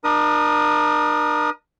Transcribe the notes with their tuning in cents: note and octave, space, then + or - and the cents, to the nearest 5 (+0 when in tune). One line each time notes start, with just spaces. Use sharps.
D4 +40 A#4 +35 D#6 +0